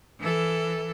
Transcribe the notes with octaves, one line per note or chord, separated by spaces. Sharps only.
E3 A4